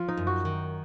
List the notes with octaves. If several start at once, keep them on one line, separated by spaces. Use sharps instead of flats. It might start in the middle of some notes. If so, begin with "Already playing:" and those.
Already playing: F3 F4
D#4
F#2
F#4
D#3